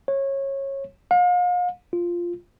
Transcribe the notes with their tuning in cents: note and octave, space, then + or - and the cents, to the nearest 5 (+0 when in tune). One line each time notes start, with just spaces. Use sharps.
C#5 -20
F5 +40
F4 -5